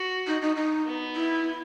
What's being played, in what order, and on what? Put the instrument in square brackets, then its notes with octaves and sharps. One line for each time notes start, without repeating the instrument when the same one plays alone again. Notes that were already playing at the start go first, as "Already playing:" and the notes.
Already playing: [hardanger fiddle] F#4
[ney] D#4
D#4
D#4
[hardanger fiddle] B3
[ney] E4